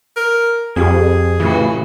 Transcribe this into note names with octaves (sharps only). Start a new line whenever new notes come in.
A#4
F2 C4 F4 G4 G#4
A2 C#3 E3 F#4